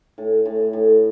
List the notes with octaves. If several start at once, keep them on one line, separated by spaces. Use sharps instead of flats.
A2
A2
A2